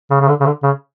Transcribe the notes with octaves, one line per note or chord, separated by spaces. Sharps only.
C#3
C#3
D3
C#3
D3
C#3